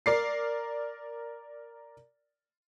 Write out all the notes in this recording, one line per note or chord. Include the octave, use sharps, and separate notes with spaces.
A#4 D5 C7